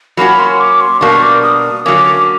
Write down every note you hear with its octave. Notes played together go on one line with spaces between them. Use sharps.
F#3 A#3 C#4 F#4 B5
C6
D6
C6
B2 G3 A#3 D4 C#6
D6
D#6
D3 F#3 A#3 C#4 D6